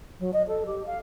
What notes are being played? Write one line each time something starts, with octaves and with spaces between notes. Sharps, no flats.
F#3
D#5
A4
G4
F5